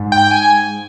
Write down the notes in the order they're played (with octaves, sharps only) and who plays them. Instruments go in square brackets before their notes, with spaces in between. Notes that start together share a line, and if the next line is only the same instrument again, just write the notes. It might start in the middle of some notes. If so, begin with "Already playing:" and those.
Already playing: [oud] G#2
[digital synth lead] G5
G#5